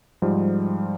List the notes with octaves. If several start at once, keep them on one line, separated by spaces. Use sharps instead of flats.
G#2 F3 G3